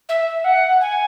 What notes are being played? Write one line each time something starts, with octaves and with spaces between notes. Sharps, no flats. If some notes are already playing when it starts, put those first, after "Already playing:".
E5
F#5
G#5